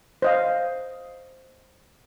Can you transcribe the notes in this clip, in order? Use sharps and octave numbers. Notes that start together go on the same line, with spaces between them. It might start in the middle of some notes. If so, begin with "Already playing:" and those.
C5 D#5 F5